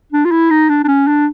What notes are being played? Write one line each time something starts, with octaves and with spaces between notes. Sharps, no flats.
D4
F4
E4
D#4
D4
D4
C#4
D4